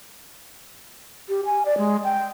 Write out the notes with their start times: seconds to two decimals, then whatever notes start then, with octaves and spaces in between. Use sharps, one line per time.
1.29 G4
1.46 G#5
1.65 D5
1.78 G#3
2.04 G5